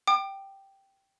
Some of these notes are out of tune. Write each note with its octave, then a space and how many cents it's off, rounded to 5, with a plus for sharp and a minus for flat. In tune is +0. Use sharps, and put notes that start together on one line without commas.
G5 -5 D6 +40